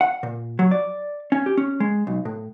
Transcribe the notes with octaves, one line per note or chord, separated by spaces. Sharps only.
F#5
A#2
F#3
D5
C#4
G4
C#4
G#3
B1
A2